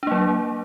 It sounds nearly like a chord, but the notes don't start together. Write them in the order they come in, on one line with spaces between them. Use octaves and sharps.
D4 A#3 F#3